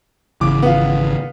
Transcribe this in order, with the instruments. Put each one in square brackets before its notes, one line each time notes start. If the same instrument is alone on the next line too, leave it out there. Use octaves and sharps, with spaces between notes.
[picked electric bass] G#1 C#3 E3 [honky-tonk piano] D6
[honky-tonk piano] B3 F4